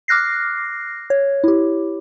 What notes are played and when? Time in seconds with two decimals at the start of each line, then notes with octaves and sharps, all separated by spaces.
0.08 D6 F6 F#6 A#6 C7
1.10 C#5
1.44 E4 G4